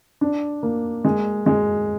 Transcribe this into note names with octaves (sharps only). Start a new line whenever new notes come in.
D4
A#3
G#3
G#3